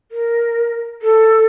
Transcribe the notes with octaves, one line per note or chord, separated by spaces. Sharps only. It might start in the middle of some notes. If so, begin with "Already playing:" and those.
A#4
A4